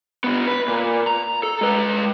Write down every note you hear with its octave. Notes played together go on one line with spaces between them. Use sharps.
D3 B3
B4
A#2
A#5
A4
G#3 B4